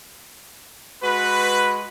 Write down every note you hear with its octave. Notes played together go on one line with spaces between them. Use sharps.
G#3 F#4 B4